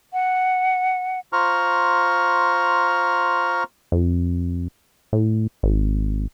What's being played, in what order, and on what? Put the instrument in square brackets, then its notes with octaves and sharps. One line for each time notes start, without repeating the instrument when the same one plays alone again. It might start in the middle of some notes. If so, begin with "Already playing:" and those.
[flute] F#5
[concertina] F4 C5 A#5 C#6 F6
[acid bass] F2
A2
G#1